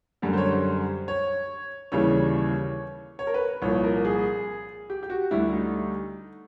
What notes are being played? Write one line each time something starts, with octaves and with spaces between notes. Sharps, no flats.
F#2 D3 G3
C5
C#5
C5
C#5
D#2 C#3 E3 G3 C#5
C#5
A#4
B4
C2 A#2 F3 C#5
A#4
G#4
G4
G4
F#4
D2 D3 G3 E4
D#4